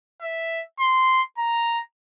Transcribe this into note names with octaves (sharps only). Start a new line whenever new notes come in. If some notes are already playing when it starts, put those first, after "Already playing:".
E5
C6
A#5